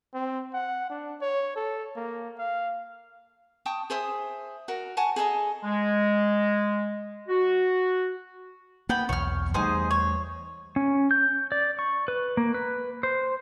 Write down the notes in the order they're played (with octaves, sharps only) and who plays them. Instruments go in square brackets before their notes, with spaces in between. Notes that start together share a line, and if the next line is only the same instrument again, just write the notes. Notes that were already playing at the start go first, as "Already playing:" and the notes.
[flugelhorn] C4
F#5
D4
C#5
A4
A#3
F5
[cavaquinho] G5 A5 C#6 D#6
G#4 C5 E5 D#6
F#4 A#4
F#5 G#5 A5 C#6
G#4 A4 D#5 A#5
[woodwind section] G#3
F#4
[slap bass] A#3 [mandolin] B3 G5 B5
[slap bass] B1 E2 [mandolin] C#5 F6
[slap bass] E2 G3 A3 [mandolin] D#4 G#4 C5
[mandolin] C#5
[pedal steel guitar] C#4
G6
D5
C#6
B4
A#3
B4
C5